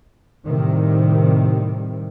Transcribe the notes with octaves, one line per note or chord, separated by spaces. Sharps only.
A2 C3 D#3 G3